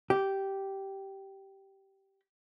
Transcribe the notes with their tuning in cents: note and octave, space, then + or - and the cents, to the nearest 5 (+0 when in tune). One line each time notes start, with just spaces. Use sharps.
G4 -10